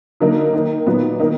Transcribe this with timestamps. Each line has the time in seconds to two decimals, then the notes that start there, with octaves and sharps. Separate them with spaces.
0.20 D3 F#3 A#3 D#4
0.53 D#3 A#3 D#4
0.87 A#2 F#3 B3 D#4
1.20 D#3 A#3 D#4